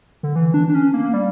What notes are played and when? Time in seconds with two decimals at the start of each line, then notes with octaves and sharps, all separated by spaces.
0.23 D3
0.36 E3
0.54 D4
0.69 D4
0.75 C#4
0.94 A#3
1.14 G3